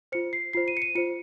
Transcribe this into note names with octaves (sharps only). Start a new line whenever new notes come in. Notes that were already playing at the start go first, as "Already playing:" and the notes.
F4 C5 C#7
C7
F4 C5 C7
D#7
C#7
D#7
F4 C5 C#7